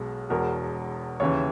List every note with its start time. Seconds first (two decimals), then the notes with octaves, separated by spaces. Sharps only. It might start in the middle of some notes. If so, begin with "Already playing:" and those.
Already playing: B1 B2 G#3
0.30 E1 E2 B2 A#4
1.20 D#2 C#3 E3 C#5